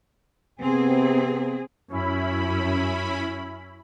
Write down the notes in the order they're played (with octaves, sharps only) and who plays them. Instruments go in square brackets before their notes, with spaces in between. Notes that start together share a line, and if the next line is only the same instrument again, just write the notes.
[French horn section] C3 B3 [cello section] C4 G#4
[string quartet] F#2 [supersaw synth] C#4 E4 B5